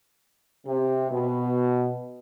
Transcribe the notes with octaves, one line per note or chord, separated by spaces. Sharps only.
C3
B2